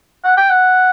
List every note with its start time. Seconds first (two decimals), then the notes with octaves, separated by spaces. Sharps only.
0.24 F#5
0.37 G5
0.50 F#5